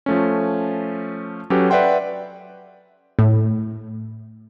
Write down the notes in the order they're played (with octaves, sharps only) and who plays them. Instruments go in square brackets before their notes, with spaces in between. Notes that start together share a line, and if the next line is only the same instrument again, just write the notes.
[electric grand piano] F3 A3 C#4
F#3 C#4 G4 A4 B4
B4 D5 E5 F#5 G5 C6
[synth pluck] A2